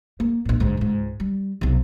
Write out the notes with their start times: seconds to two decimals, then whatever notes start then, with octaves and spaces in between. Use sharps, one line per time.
0.20 A#3
0.45 A#1 A2
0.60 D2 G#2
0.77 C#2 G#2
1.20 G3
1.61 B1 C3